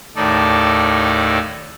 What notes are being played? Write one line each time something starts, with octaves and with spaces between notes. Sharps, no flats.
D#2 A2 D#4 A4 D5